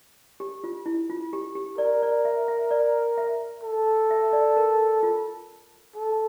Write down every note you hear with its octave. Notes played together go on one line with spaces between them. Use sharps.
G4
F4
E4
F4
G4
G4
A#4 D5
D5
E5
E5
D5
E5
A4
E5
D5
A#4
F4
A4